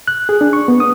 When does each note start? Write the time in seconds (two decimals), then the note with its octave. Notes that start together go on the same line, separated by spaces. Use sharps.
0.08 F#6
0.29 G#4
0.41 D4
0.53 C#6
0.68 B3
0.80 D#6